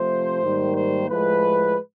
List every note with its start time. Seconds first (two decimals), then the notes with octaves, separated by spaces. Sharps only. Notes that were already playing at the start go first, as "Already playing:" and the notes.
Already playing: C3 F3 A3 C5
0.43 G#2 D#3 G3 A#3
0.76 C5
1.10 A2 F3 G#3 B4